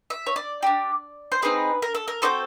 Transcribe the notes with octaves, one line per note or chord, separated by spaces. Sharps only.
E5
C#5
D5
D4 G4
C5
C4 D#4 G#4 B4
A#4
A4
A#4
C4 D#4 F#4 A4 C5